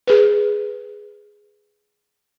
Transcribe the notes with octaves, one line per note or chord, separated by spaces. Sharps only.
G#4 B4